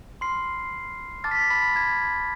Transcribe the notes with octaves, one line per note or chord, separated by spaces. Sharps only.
B5 C6 F6 C7
A5 D6 F6 A6
B6
A6
B5 B6
G#6